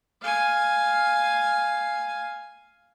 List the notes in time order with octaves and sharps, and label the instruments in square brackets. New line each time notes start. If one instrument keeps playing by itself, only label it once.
[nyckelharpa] F5 G#5